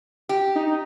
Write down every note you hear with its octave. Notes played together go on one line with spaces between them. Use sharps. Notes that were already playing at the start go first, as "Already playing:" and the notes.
G4
D#4